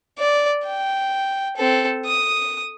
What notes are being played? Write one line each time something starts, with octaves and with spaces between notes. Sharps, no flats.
D5
G5
C4 A4
D#6